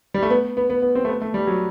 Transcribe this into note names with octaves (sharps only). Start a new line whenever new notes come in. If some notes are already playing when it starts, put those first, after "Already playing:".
G3
A3
B3
B3
B3
B3
C4
A3
B3
A3
G3
F#3